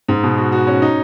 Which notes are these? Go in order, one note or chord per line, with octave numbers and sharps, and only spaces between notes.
G#2
B2
F#4
F#4
C#4
D#4